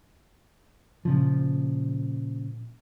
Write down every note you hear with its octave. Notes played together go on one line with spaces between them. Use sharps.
A#2 C#3 F3